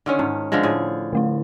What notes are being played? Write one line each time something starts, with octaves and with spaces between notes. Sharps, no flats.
D3 D#3 C#4
G#2 C#4
D3 F3 G#3
A2 G#4
D3 A3 E4